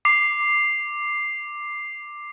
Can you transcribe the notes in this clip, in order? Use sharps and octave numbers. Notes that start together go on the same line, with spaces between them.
D6 C7